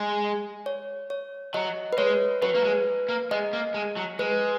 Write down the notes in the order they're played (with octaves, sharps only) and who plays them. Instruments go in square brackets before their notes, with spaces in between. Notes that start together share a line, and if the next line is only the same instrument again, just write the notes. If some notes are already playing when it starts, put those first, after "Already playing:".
Already playing: [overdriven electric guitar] G#3
[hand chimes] C#5
C#5
[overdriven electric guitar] F#3 [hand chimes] D#5
[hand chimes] B4
[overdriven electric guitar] G#3 [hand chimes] C#5
[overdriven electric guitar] F#3 [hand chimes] B4
[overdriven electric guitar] A#3
G#3
A#3
[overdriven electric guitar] G#3 [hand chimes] D#5
[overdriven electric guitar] A#3
G#3
F#3
[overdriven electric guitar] G#3 [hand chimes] B4